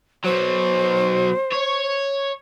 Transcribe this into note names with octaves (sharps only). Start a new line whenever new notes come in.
B2 F#3 C5
C#5